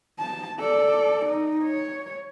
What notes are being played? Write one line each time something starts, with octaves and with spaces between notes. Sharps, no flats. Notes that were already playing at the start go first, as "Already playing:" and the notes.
A5
A4 D5
D#4
C#5